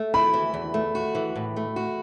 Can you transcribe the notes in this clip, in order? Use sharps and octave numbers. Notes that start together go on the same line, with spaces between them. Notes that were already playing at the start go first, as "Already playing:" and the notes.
Already playing: A3
E4 B5
E3
E2
A3
F#4
E3
A2
A3
F#4